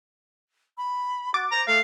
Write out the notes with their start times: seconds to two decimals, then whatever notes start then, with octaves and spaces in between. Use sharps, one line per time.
0.77 B5
1.34 F#4 D6 A6
1.51 C5 A#5
1.67 A3 F5